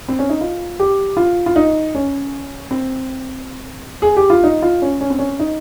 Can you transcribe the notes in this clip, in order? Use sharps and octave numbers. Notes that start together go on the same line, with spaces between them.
C4
C#4
D#4
F4
G4
F4
F4
D#4
C#4
C4
G#4
G4
F4
D#4
F4
C#4
C#4
C4
C#4
D#4